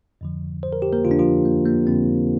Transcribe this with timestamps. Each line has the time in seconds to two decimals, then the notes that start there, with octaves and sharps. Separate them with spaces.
0.21 F2 D3 F3
0.63 C5
0.73 A#4
0.82 G4
0.93 A#3 A#4
1.05 F2 D3 F3 F4
1.11 D4
1.19 F3 F4
1.45 A#3
1.66 A#3
1.87 F2 D3 F3 C4